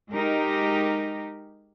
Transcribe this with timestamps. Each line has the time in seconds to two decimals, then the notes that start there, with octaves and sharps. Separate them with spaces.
0.12 G#3 D#4 G4 A#4